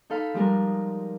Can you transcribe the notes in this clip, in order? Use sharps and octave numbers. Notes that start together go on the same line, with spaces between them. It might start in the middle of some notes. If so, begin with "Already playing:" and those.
D#4 A4 F5 B5
F3 G3 G#3 A#4